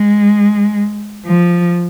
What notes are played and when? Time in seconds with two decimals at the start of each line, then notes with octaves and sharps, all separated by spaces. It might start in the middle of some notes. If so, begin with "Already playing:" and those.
Already playing: G#3
1.26 F3